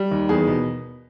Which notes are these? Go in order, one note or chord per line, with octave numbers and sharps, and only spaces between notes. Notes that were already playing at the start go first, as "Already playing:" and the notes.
Already playing: G3
D#2
E2 G#4
B2